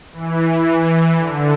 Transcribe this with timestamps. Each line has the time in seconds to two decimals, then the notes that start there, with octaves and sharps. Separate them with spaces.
0.13 E3
1.18 D3